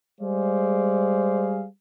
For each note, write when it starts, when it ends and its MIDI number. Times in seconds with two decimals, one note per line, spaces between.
0.21 1.65 55
0.21 1.65 56
0.21 1.65 68
0.21 1.65 72
0.21 1.65 74
0.21 1.65 77